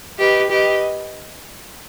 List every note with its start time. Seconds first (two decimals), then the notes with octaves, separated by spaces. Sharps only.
0.18 G4 B4 D#5
0.49 G4 B4 D#5